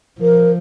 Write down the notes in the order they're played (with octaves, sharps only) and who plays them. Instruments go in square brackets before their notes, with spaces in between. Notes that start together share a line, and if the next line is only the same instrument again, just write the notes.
[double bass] F3 [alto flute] A#4